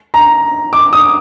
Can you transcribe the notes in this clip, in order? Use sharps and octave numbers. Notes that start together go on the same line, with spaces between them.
A#5
D6
D#6